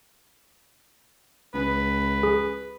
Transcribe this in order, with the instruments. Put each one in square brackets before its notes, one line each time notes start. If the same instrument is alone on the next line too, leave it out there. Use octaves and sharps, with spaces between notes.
[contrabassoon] C#2 [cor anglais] B4
[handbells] G#4